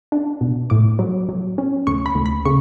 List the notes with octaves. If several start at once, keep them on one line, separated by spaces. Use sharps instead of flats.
D4
B2
A2 D6
F#3
F#3
C#4
D2 C#6
B5
D2
B5
C#3 C#6